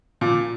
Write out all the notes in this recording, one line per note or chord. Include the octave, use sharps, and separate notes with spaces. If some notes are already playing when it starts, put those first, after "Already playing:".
A#2